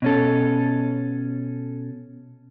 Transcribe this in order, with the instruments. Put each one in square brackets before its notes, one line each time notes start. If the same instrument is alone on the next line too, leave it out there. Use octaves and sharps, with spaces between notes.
[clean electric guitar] B2 C#4 A4